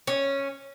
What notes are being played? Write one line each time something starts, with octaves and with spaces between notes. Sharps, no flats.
C#4